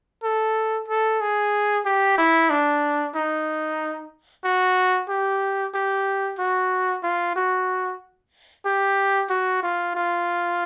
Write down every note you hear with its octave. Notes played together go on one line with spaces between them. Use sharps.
A4
A4
G#4
G4
E4
D4
D#4
F#4
G4
G4
F#4
F4
F#4
G4
F#4
F4
F4